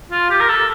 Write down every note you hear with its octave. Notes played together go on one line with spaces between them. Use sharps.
F4
G4
A#4
A4